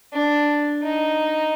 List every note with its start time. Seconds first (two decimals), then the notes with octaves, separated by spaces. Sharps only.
0.13 D4
0.83 D#4